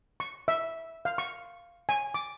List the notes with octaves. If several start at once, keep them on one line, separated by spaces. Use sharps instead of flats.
C#6
E5
F5
C#6
G#5
D6